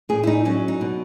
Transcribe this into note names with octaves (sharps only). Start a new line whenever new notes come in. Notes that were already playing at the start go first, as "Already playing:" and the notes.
A2 G#4
E4
D#4
F#3 C#4
D#4
B2